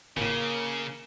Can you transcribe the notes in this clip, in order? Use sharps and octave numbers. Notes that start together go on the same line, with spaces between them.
G#1 A2 C#3 A#3